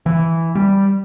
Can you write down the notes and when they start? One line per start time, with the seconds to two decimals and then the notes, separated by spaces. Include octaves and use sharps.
0.06 E3
0.55 G3